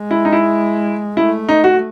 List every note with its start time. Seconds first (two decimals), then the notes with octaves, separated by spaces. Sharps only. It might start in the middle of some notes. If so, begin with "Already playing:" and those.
Already playing: G#3
0.11 E4
0.25 D#4
0.32 E4
1.17 A3 E4
1.49 D#4
1.64 F#4